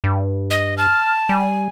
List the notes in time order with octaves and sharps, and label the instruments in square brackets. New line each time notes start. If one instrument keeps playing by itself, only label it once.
[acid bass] G2
[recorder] D#5
[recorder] A5 [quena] F6
[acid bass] G3 [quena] G#5